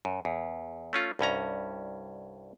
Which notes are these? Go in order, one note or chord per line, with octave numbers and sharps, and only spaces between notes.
F#2
E2
A3 C#4 F4
C2 G2 C#4 A#5